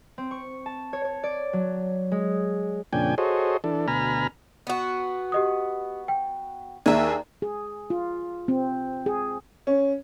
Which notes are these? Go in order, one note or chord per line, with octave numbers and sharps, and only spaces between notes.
C4
C#6
A5
C#5
C#5
D5
F#3
G#3
F2 A#2 C#3 D4 G5 G#5
F#4 G#4 A4 C5 C#5 D#5
E3 D4 A4
D2 B2 G#5 A#5 B5 F6
B3 F#4
G4 D#5 D#6
G5
D#2 G#4 D5 E5 A#5
G#4
F4
C4
G#4
C#4